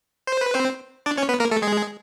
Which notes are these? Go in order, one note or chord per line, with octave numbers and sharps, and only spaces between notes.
C5
B4
C4 C5
D4 D5
C#4 C#5
B3 B4
A#3 A#4
A3 A4
G#3 G#4